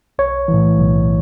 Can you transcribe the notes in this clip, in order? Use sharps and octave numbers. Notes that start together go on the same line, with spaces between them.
B1 C#5
E3
A2
B1